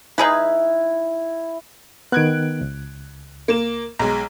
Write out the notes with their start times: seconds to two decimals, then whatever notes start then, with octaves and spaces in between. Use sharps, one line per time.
0.18 D#4 E4 G#4 B4
2.12 D#3 B3 F#6 G#6 D7
2.61 C#2
3.48 A#3 E7
3.99 B1 G#3 A#5